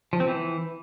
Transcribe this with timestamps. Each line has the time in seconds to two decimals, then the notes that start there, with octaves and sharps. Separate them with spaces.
0.13 F3
0.20 C4
0.27 E3